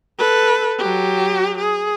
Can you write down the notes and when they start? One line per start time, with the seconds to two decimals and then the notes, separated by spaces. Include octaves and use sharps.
0.19 A4 B4
0.79 F#3 G4
1.59 G#4